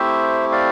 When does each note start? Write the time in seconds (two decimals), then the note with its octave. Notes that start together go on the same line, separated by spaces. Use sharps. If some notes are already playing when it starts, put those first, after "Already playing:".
Already playing: A3 C4 E4 G4 C5 E5
0.52 D5 F5